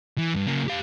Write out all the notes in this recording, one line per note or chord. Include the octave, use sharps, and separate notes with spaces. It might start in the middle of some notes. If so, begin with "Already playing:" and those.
E3
G2
C#3 A#3
G4 F5